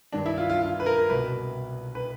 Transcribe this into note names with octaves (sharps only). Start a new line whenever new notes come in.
G2 D#3 D4
E4
F4
F4
F4
B4
A#4
C2 B2 B4
B4